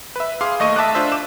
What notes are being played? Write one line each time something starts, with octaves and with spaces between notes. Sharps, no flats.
B4 E5
G#4 F5 C6 D6
D#2 A3 D#5 C#6 D#7
E5 A5 D6 F#6
D4 F4 C5 E5
D6 E7